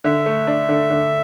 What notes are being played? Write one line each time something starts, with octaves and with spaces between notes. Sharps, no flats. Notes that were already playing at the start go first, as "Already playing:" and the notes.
D3 E5
A3
D4
D3
D3